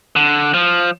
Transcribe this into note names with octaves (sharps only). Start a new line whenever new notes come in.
D3
F3